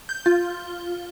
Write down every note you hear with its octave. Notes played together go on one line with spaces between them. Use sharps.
G6
F4